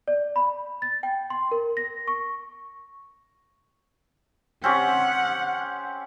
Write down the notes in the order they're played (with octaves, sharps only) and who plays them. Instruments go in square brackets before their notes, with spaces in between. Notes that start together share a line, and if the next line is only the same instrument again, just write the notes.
[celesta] D5
B5
A6
G5
C6
A#4
A#6
C#6
[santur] C4 C#4 G4 [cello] F#5